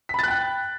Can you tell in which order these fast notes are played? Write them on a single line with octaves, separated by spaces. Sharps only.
B6 B5 A6 F#6 G5